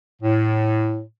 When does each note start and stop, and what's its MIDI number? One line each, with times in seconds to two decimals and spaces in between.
0.22 1.02 45